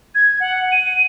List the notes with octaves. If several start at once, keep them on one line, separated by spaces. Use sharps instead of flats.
G#6
F#5
D#7